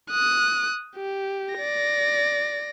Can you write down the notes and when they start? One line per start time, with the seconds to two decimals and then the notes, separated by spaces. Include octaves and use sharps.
0.10 D#6 F#6
0.96 G4
1.54 D5 A#6